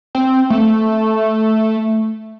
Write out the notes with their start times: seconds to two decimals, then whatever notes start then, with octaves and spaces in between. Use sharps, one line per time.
0.15 C4
0.50 A3